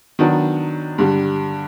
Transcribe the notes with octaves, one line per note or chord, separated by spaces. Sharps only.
D#3 F#3 B3 D4
G2 D3 G3